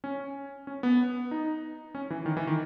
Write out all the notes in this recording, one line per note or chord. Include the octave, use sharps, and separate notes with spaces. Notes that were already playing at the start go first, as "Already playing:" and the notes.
C#4
C#4
B3
D#4
C#4
E3
D#3
E3
D#3